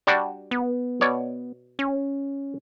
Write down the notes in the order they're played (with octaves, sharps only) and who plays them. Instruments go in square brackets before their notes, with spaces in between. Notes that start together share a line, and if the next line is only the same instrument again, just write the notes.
[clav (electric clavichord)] G3 D4 F#4
[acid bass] B3
[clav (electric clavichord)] B2 C#5 D5
[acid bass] C#4